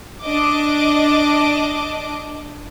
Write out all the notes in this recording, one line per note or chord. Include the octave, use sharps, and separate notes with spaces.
D4 D#5 D6